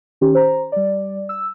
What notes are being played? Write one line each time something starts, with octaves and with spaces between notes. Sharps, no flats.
D#3 C#4 G4
C5 A#5
G3 D5
E6